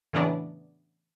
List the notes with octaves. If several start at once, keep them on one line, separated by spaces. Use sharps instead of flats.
A2 C#3 E3 F#3 B3 D4